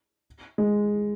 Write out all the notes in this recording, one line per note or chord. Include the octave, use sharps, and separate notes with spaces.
G#3